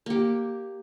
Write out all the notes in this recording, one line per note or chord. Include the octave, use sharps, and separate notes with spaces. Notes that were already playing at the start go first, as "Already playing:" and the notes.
A#3 G4